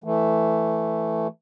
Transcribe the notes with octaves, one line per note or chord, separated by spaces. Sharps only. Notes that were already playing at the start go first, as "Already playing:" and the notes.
E3 A3